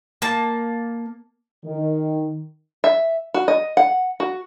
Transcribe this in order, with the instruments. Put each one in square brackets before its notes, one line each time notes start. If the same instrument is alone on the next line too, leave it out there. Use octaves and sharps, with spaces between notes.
[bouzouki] A#3 A5
[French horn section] D#3
[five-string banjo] E5
F#4
D#5
F#5
F#4